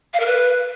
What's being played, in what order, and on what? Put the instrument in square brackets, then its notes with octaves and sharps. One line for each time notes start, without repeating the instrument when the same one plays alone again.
[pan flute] F5
A#4
B4